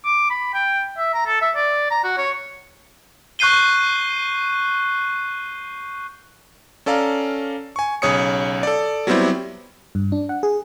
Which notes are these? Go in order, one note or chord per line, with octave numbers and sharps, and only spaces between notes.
D6
B5
G5
E5
A#5
A4
E5
D5
A#5
F#4
C#5
C#6 F#6 G6 C7 D#7 G7
C#4 A4 D5 F5 A#5
G#5 C#6
B1 C#3 C#5 D#6 C#7
A4 D5
F#3 G3 B3 C4 E4 G4
G2
D4
F#5
G#4